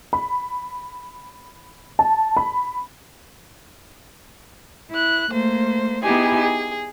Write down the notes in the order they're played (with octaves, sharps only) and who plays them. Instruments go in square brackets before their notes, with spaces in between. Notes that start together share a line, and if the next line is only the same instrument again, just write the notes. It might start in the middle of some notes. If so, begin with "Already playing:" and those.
[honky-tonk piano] B5
A5
B5
[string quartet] E4 F#6
A3 A#3 C5
B3 D#4 E4 G4 G#4 G#5
G#4